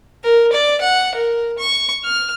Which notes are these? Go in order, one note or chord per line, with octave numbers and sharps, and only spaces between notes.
A#4
D5
F#5
A#4
C#6
F6